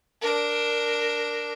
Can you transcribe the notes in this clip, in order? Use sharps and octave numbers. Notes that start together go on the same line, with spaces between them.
D4 A#4